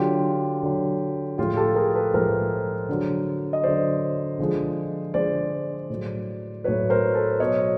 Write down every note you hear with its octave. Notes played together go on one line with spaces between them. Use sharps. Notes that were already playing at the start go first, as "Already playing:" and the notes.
Already playing: D3 F#3 F4 G4
D3 F#3
A2 F3 G#3 F4 G4
G4 A4
G#4 A#4
A4 B4
A2 F3 G#3 A#4 C5
D3 F#3
D#5
D3 F#3 C5 D5
D3 F3 G#3
D3 F3 G#3 C5 D5
A2 F#3
A2 F#3 B4 C#5
A#4 C5
A4 B4
B2 F#3 C#5 D#5